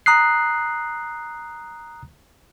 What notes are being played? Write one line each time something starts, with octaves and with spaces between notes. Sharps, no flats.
A#5 D#6 F#6 C7